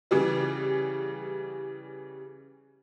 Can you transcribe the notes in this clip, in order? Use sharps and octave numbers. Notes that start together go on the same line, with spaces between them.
C#3 E3 G3